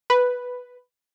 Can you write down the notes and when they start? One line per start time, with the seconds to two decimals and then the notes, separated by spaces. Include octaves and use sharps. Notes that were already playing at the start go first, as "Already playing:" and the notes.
0.10 B4